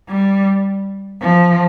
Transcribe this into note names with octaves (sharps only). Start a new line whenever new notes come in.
G3
F3